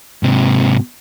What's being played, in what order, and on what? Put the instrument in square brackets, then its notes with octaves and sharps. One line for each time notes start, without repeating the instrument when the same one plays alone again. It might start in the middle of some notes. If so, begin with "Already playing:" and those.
[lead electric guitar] G#2 C3